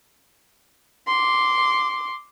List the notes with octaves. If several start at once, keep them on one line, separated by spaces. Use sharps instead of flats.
C6 D6